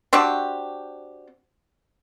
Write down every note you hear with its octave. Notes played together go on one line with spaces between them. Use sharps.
C4 D4 F#4 G4